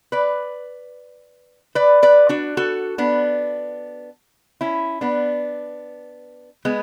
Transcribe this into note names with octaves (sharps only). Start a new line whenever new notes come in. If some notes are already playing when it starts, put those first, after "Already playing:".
B4 D5
B4 D5
B4 D5
D4 F#4
F#4 A4
B3 D4
C#4 E4
B3 D4
G#3 B3